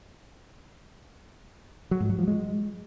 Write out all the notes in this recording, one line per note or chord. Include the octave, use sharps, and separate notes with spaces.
F#3
G#2
F#3
F3
G#3